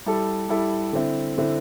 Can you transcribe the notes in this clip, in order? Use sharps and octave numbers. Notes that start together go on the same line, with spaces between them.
G3 E4 A4
G3 E4 A4
D3 C4 E4
D3 C4 E4